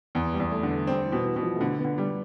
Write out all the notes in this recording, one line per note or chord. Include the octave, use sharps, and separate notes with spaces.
E2 B3
G3
E2
A3
D3
A3
G3 C4
E3
B2
E3
B2
F3
A3
D3 B3
B3
D3
G3